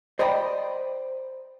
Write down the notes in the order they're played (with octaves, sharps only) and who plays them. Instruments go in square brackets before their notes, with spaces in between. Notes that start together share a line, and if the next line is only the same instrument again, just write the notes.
[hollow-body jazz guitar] C5 D5 D#5 G5 A#5 B5